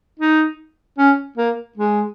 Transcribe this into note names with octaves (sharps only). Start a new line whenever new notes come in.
D#4
C#4
A#3
G#3